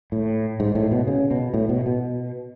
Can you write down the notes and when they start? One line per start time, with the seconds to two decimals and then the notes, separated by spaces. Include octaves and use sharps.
0.12 A2
0.60 G#2
0.75 A2
0.91 B2
1.07 C#3
1.31 B2
1.54 A2
1.69 B2
1.86 B2